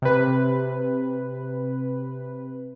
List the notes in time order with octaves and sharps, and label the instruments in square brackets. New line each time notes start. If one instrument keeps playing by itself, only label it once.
[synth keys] C3 B4